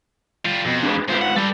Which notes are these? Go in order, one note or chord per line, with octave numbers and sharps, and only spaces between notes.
G3 F4
F2 B2
D4 G#4 B4
G#2 C3 F4 B4 C5
F#5
G3 A4 B4